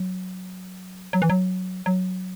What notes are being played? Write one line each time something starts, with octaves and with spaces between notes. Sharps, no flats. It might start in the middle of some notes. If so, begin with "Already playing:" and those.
Already playing: F#3
F#3
E3
F#3
F#3